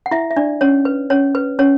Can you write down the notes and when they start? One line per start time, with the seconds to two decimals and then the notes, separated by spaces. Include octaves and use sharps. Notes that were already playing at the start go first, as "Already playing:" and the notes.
0.06 F#5
0.11 E4 E5
0.31 E5
0.36 D4 D5
0.61 C#4 C#5
0.85 B4
1.10 C#4 C#5
1.35 B4
1.59 C#4 C#5